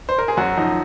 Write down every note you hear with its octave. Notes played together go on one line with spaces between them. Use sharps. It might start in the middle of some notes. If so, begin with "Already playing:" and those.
C5
A#4
G#4
F#2 F#4
F3 D#4